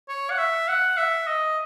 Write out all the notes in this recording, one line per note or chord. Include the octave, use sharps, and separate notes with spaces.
C#5
F#5
E5
F#5
E5
D#5